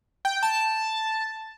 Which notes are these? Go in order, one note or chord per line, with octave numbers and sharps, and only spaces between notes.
G5
A5